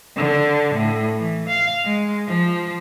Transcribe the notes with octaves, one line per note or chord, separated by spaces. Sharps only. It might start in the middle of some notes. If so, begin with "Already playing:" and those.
D3
A2
E3
F5
G#3
F3